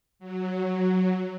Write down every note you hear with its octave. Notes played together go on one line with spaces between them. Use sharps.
F#3